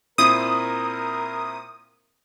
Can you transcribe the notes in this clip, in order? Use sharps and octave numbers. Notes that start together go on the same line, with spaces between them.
A#2 C4 E4 A#4 D#6